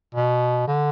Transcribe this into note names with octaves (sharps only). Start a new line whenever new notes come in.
B2
D3